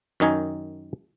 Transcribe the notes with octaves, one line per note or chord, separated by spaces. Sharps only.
F#2 D#3 D#4 G#5